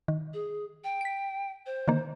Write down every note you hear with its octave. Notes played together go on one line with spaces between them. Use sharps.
D#3
G#4
G5
B6 D7
C5
D3 D#3 A#3